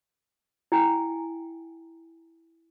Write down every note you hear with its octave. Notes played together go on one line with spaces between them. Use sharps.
E4 G5 G#5